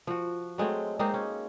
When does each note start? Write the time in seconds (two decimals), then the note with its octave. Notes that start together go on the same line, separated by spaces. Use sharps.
0.07 F3 F#4
0.58 F#3 G#3 A3 C4
0.99 G#3 A#3 C4 D#4
1.14 C#4